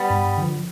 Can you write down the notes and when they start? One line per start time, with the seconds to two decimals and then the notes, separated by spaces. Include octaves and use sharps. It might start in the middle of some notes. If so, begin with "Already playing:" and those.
Already playing: G3 B3
0.10 G2
0.37 D3 F3